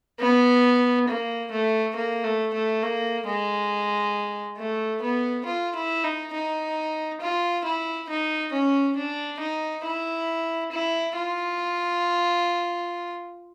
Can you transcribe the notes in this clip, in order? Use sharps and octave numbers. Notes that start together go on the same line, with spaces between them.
B3
A#3
A3
A#3
A3
A3
A#3
G#3
A3
B3
F4
E4
D#4
D#4
F4
E4
D#4
C#4
D4
D#4
E4
E4
F4